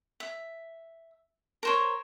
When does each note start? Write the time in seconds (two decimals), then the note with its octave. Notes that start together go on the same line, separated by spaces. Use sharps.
0.20 E5
1.63 A#4 C5 C#5